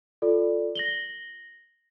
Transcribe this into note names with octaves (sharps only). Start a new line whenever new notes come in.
F4 A4 D5
A#6 F#7 G7